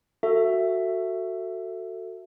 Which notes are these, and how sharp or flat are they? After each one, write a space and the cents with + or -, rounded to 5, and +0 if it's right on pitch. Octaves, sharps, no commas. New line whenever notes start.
F#4 +0 A4 +25 E5 +10